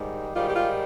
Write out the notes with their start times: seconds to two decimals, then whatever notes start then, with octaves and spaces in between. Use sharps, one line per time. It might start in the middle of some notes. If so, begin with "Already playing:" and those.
Already playing: G#2 D#3 G3
0.35 G#2 D#3 G3 F4
0.50 G4
0.56 F4